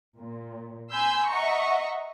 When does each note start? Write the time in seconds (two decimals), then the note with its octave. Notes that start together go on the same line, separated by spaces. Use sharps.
0.17 A#2
0.92 G#5 B5 C6 E6 G6
1.30 D#5 E5 F#5 A#5 C#6